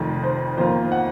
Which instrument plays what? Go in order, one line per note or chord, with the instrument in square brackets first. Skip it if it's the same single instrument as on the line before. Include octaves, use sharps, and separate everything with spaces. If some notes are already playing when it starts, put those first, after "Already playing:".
Already playing: [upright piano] F1 F2 D#3
[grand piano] C5
[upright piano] F2 D#3 A#3 F4 [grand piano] C5
[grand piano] F#5